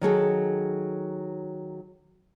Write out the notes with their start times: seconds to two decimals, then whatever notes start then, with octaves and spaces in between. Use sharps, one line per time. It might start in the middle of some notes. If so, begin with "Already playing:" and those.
0.01 D#3 F#3 G#4 A4